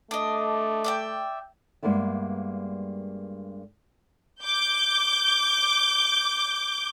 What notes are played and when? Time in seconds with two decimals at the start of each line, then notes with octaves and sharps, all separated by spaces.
0.11 A3 D4 D#5
0.84 D5 E5 G5
1.83 G2 G3 G#3 A#3 B3 E5
4.43 D6 G6